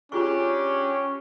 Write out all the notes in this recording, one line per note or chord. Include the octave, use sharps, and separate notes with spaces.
G3 C#4 D4 F4 G4 G#4 C#6